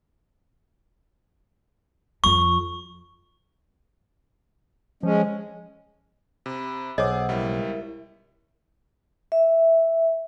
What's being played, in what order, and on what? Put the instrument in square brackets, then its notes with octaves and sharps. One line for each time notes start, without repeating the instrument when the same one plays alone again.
[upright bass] F2 F3 [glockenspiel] C#6
[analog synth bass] F3 [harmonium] G#3 C#4
[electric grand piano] C3 [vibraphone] B5
[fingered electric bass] B1 [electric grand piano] G#4 D6 [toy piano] C5 C#5 D#5 [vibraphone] F#5 E6
[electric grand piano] C#2 G3 [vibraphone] E4 A#4 E5
[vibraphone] E5